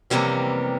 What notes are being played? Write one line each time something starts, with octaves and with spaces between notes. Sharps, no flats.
F2 C3 E3 G3 A#3 B3 C#4